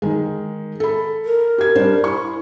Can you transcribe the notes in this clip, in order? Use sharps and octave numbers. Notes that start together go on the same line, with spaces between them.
D#3 G#3
A4 B5
A#4
G4 G#6
G3 D4 C5
E4 C#6